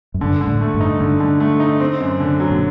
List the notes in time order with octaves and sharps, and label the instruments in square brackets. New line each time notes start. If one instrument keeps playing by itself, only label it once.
[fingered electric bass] F#2
[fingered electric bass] G2 [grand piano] D3
[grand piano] D3
[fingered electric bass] A2
[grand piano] A3
[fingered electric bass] G2
[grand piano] D#4
[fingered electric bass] G2 [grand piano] D3
[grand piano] D3
A3
D#4
C4
F#2
D3
F#3
[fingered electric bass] A#2